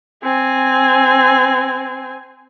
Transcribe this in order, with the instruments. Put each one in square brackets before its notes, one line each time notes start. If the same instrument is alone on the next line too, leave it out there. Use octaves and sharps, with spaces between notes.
[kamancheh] C4 G#5